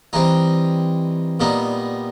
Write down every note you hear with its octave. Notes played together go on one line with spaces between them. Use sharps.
E3 G3 C4 D#4
A#2 G3 B3 D#4